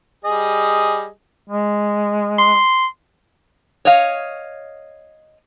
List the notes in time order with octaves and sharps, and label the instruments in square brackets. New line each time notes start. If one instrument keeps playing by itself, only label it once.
[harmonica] G3 G#4 D#5
[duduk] G#3
[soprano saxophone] C6
[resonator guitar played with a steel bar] C#5 D#5 F5